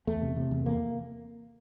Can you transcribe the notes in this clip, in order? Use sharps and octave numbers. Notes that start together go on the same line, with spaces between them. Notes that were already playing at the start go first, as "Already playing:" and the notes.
E2 A3
C3
C3
E2
E2 A#3